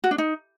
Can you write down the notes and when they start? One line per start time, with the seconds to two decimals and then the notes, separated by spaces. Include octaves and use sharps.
0.04 F#4
0.11 D4
0.18 D#4